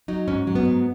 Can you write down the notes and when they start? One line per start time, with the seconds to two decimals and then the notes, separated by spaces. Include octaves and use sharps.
0.08 F#3 D#4
0.28 G#2 C#4
0.47 F#3
0.55 B3
0.65 G#2